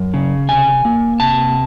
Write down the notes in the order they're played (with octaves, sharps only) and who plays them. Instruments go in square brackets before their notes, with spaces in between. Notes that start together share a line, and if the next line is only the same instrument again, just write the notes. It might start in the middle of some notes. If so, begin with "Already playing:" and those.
Already playing: [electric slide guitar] F#2
C#3
C3 G#5
A#3
C3 A5